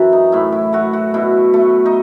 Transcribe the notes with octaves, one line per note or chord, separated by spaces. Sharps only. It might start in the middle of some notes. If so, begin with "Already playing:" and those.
Already playing: F#2 E3 A4 B4
D#4
A2 E4
E4
A3 F#4
F#4
B2 E4
A3
D#4